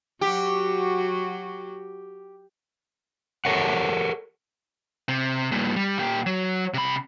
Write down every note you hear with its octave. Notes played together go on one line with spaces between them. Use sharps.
F#3 F#4 G4
G4 A4 A#4 C#5 F#5
C3
G2 A#2
G3
A#2 G4
F#3
C3 B5